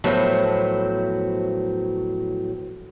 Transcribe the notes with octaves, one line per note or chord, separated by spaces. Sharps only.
A2 F3 F#3 B3 C5 E5